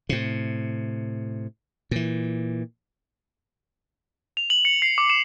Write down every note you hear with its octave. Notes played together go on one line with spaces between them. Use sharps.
A2 C3
A#2 E3
F7
F#7
C#7
C7
D6
E7